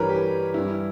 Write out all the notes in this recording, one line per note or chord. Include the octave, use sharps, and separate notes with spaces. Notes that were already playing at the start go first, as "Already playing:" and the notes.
Already playing: G2 E3 G3 A#4 B4 C#5
G4
G2 E3 G3 E4